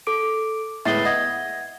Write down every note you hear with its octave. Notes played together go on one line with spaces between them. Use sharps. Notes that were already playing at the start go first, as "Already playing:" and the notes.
A4 D6 D7
A2 G#3 B3 E5 A6 C7 G7
D#5 F#5 G#6